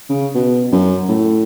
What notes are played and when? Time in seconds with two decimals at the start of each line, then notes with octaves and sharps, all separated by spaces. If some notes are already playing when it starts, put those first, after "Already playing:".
0.09 C#3
0.35 B2
0.72 F#2
1.08 A2